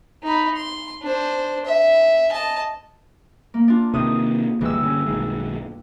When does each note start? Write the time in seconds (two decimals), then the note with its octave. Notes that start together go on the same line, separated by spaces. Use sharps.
0.23 D#4 B5
0.56 C6
1.02 D4 C5
1.65 E5
2.32 D#5 A5
3.54 A#3
3.68 D4 F4
3.94 C3 D#3 D#6
4.61 D2 G2 E3 G#3 E6
4.82 D3 C#4
5.06 B1 D#3 G#3